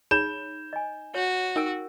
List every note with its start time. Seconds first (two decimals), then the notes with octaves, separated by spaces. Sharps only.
0.11 D#4 G#4 C#5 B5 G6 E7
0.73 D#5 G#5
1.15 F#4 C#5
1.56 D#4 A#4 G5 E6 D7